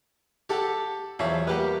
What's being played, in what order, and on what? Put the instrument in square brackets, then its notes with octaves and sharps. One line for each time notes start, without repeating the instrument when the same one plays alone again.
[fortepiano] G4 A4 [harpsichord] C#5 F#5 A5
[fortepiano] E2 C#5 E5 [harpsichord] F3 F#3
[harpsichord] G3 A3 F#5 [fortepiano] A#3 G4 B4